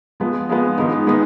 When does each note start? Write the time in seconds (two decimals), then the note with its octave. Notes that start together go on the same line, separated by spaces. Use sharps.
0.20 F3 G#3 B3
0.49 F3 G#3 B3
0.77 G#2 D#3 G#3 B3 D#4
1.06 D#3 G#3 B3 D#4